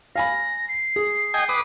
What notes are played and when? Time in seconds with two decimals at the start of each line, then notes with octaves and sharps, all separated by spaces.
0.16 F5 G#5 B5 A#6
0.68 C7
0.96 G#4
1.34 D#5 G5 G#5
1.49 B4 D6 D#6